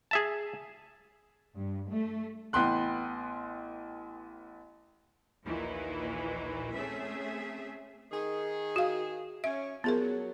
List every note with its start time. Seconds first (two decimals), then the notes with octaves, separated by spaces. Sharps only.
0.11 G#4 E5 A5
1.56 G2
1.90 A3
2.53 A1 B3 G5 C6 F#6
5.45 A#1 D#2 A#2 D#3 E3
6.74 A3 C4 C#4 G#4 E5
8.12 D#3 G#4
8.76 F#4 F5
9.44 C#4 E5
9.84 F3 F#3 B3 G#4 A#4
10.01 F#3